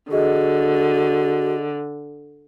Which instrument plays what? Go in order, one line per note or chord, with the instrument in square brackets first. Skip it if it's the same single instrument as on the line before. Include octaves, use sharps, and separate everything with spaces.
[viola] D3 [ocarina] F#4 [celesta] G#4 D#5